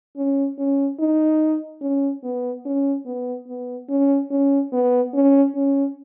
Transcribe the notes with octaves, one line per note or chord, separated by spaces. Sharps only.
C#4
C#4
D#4
C#4
B3
C#4
B3
B3
C#4
C#4
B3
C#4
C#4